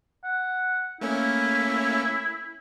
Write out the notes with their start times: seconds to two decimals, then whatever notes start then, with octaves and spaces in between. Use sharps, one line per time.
0.24 F#5
1.01 A3 A#3 C#4 E4